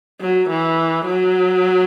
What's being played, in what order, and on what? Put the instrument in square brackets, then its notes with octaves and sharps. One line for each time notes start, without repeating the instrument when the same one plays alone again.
[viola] F#3
E3
F#3